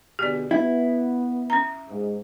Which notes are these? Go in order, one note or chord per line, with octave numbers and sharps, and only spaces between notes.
B2 D3 G4 G#4 D5
B3 E4
C#4 A#5
G#2